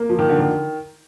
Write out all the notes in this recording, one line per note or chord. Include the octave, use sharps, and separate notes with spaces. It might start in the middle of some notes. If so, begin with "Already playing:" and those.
Already playing: A#3
F3
D#3
D3
D#3